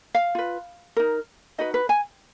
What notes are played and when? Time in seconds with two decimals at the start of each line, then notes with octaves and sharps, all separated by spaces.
0.15 F5
0.35 F4 B4
0.97 D#4 A#4
1.58 D#4 F#4 B4 D#5
1.74 B4
1.89 G#5